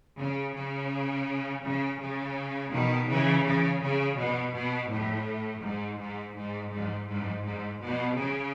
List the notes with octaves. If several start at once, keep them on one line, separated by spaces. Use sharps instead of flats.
C#3
C#3
C#3
C#3
B2 D#3
C#3 E3
C#3
C#3
B2
B2
A2
G#2
G#2
G#2
G#2
G#2
G#2
B2
C#3